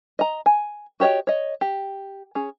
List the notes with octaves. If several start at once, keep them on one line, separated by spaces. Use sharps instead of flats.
D#5 A#5
G#5
F#4 G4 C#5 D#5 G5
C#5 D#5
G4
C#4 G#4